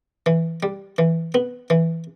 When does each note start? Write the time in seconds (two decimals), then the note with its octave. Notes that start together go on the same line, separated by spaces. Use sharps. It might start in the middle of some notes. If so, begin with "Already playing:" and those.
0.26 E3
0.63 G3
0.98 E3
1.34 B3
1.70 E3